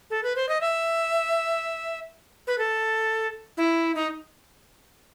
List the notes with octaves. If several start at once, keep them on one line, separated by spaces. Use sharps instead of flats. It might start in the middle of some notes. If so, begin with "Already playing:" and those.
A4
B4
C5
D#5
E5
B4
A4
E4
D#4